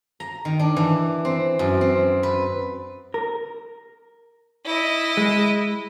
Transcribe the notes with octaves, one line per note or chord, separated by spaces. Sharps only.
A#5
D#3
D4
E3
C4
F#2
C4
B4
A#4
E4 D#5
G#3